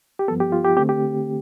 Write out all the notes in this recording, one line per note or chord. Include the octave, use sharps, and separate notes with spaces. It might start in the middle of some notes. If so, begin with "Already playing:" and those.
G4
G2 F3 B3 A4
G4
F4
G4
D3 A3 C4 G4
G4